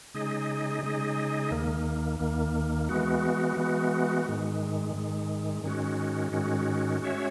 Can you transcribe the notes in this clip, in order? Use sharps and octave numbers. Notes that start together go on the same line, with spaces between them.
C#3 G#3 D#4 G#4 D#5
C#3 G#3 D#4 G#4 D#5
D#2 D#3 A#3
D#2 D#3 A#3
E3 G#3 B3 F#4
E3 G#3 B3 F#4
G#2 D#3 G#3
G#2 D#3 G#3
G#2 D#3 G#3 C#4 F#4
G#2 D#3 G#3 C#4 F#4
G#3 C#4 F#4 C#5 E5